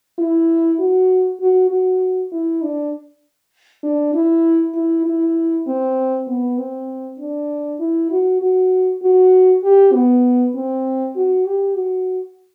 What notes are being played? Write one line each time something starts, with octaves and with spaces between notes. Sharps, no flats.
E4
F#4
F#4
F#4
E4
D4
D4
E4
E4
E4
C4
B3
C4
D4
E4
F#4
F#4
F#4
G4
B3
C4
F#4
G4
F#4